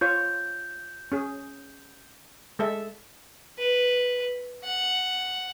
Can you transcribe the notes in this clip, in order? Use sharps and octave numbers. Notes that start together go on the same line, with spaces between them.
F4 C#5 G6
C#4 G#4
G#3 A4 E5
B4
F#5